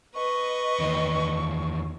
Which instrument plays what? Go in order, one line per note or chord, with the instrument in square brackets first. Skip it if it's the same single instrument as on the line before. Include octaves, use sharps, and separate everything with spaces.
[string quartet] B4 D#5 [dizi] C#6
[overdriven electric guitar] E2 D#3